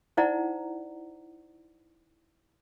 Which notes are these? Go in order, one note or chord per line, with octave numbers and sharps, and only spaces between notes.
D#4 E4 C5 D5 F#5 A#5